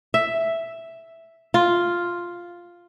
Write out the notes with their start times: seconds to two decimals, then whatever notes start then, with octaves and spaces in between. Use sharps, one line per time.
0.14 E5
1.54 F4